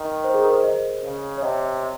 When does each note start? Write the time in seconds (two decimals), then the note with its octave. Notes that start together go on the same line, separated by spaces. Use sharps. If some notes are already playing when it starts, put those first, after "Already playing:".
Already playing: D#3
0.24 C5
0.34 G#4
0.44 A#4
0.54 C5
0.63 D#5
1.03 C#3
1.38 C#5
1.42 C3 D#5